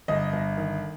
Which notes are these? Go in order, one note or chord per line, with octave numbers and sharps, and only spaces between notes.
G1 D#5
G1
D#3